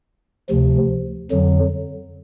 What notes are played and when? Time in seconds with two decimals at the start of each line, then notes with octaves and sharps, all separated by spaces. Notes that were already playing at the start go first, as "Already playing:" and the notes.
0.49 D2 C3 F3
1.31 F2 D3 F#3